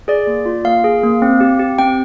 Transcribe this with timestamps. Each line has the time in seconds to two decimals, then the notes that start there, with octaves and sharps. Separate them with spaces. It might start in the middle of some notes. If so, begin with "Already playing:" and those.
0.08 G#4 D5
0.27 A#3
0.46 F4
0.64 A#3 F5
0.84 G#4
1.04 A#3
1.22 C4
1.40 G4
1.59 G4
1.79 C4 G5